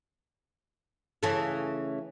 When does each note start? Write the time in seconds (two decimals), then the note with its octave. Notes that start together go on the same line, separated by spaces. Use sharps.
1.23 C#3 E3 A3